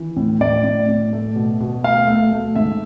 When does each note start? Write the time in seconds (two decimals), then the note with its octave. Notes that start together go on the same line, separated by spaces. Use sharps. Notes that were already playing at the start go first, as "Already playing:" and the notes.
Already playing: E3
0.16 A2
0.40 A2 D5
0.64 A2
0.88 A2
1.13 A3
1.36 B2
1.61 B2
1.83 A3 F5
2.08 A3
2.32 A3
2.56 G#2 E5